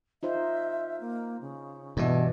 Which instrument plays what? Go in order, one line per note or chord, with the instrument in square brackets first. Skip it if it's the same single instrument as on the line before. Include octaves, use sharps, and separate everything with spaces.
[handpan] D#4 F4 C5 [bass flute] E5
[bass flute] A#3
C#3
[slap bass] G2 E3 [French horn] B2